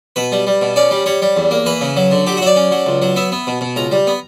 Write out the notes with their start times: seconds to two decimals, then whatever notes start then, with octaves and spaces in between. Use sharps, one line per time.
0.16 B2 B4
0.32 G3
0.47 G3
0.62 B2
0.76 C#4 D5
0.91 G3
1.06 G3 C#5
1.22 G3
1.37 E2
1.51 A#3
1.66 E3 B4
1.81 C#3
1.97 F#3
2.11 D3
2.27 F#3 G4
2.37 F#4
2.42 F#3 E5
2.46 D5
2.56 C#4
2.72 F#3
2.86 C#2
3.02 F#3
3.16 B3 E5
3.32 B3
3.47 B2
3.61 B2
3.76 C#2 A#5
3.91 G3
4.07 B3